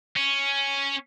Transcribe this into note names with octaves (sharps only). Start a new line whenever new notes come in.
C#4